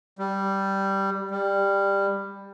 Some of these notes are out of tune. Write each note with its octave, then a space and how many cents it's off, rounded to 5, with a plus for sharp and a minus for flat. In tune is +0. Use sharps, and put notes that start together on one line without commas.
G3 -5
G3 +15